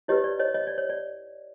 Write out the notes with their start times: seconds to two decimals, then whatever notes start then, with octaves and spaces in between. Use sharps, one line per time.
0.08 E4 G4 B4 C#5 D#5
0.24 D5
0.39 C#5 D#5
0.54 C#5 D#5
0.67 D5
0.78 C#5
0.89 D5